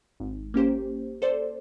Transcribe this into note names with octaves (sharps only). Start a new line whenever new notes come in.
G#1
A#3 C#4 G4 C5
A4 C5 D5